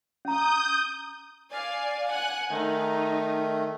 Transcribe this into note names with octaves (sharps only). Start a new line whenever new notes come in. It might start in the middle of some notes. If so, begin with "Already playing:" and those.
C#4 A#5 D#6 G6
D5 F5 G#5
F#5 G#5 F#6
D#3 A3 D#4